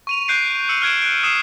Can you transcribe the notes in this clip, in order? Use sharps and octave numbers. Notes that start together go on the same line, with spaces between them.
C#6 D#7 F7
F#6 G6 C7 D7 D#7
E6 C#7 D#7
F6 F#6 G#6 D7 E7
F#6 D7
D#6 E6 C7 E7